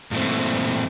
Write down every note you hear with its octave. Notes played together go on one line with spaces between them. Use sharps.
G2 A#2 E3 A3 C4